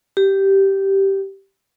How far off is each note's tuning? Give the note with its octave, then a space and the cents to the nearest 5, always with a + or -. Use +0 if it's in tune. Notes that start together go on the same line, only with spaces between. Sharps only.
G4 -10